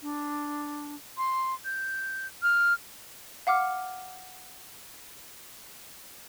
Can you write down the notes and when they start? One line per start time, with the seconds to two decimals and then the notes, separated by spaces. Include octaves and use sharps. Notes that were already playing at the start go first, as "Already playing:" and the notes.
0.01 D4
1.17 C6
1.65 G6
2.43 F6
3.47 F5 F#5 D6 F6